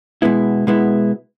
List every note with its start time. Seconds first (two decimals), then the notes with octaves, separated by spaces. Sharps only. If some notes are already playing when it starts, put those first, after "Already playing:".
0.22 B2 G#3 B3 E4
0.67 B2 G#3 B3 E4